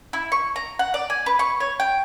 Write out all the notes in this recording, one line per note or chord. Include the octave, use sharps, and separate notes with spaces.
E4
C#6
A#5
F#5
D5
G#5
B4
C#6
C#5
G5